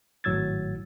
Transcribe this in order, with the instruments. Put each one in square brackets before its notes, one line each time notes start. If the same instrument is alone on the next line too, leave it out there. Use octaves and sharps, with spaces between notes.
[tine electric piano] G#1 A2 F#3 E6 G#6 A6